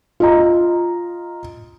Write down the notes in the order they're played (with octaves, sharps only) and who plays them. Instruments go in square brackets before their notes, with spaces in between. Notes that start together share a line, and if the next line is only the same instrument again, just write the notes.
[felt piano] F4 D#5 A#5